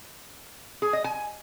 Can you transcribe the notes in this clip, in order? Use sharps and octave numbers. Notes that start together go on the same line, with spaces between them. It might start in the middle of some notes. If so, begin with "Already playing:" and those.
G#4
D#5
G#5